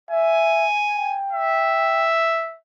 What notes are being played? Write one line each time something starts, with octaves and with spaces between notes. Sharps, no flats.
E5 G#5
G5
E5